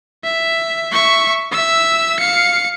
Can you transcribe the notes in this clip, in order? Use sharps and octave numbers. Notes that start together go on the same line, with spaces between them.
E5
E5 C#6
E5 E6
F5 C#7